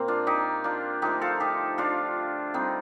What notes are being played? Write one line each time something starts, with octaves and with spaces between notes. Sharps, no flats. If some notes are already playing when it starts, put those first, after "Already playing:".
Already playing: A#2 A#3 C4
D4 F4
D#4 G4
D4 F4
D3 F3 A3 D#4 G4
F4 A4
D#4 G4
D4 F4
D3 G3 C4 D#4